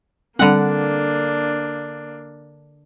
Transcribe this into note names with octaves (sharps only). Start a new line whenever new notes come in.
D3 G3 A#3 C4 D4 F#5